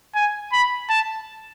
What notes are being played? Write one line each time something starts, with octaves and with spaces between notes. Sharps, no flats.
G#5
B5
A5